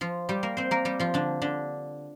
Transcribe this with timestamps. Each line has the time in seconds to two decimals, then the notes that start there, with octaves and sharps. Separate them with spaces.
0.01 F3 F4
0.29 G3 G4
0.43 A#3 A#4
0.57 C4 C5
0.71 A#3 A#4
0.85 G3 G4
1.00 F3 F4
1.14 D3 D4
1.42 D3 D4